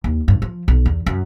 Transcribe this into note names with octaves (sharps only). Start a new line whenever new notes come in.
D#2
G2
F3
B1
E2
F#2